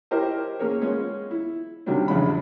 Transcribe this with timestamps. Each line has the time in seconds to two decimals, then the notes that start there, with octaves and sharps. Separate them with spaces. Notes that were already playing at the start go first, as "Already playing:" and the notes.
0.11 E4 G4 A#4 C5 C#5 D#5
0.59 A#3 C#4 G#4 A#4 C#5
0.81 G#3 B3 C#4 F4
1.31 E4
1.86 C3 D#3 F#3 G3 C#4 D4
2.08 A#1 E2 C#3 G#3 D4 B5